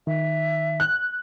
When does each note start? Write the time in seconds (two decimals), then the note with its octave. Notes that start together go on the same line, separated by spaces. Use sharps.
0.07 D#3 E5
0.80 F#6